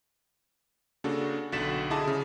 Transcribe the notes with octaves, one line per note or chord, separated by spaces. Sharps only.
C#3 A#3 D4 F#4 A4
B1 D3 F#4 A6 B6 E7
D3 E4 G#4 D#5 A5 D6
C#3